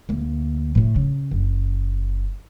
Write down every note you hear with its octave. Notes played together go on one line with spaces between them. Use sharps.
D2 A#3
A2 A3
C#3
F#1